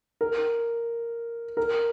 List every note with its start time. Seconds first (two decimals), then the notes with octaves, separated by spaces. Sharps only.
0.21 A#4
1.57 A#4